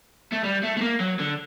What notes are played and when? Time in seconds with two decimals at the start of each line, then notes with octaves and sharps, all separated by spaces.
0.32 A3
0.44 G3
0.63 A3
0.77 A3
0.81 A#3
1.00 F#3
1.19 D3